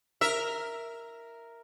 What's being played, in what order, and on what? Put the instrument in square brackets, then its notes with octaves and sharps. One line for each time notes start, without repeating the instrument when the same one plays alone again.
[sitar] A#4 E5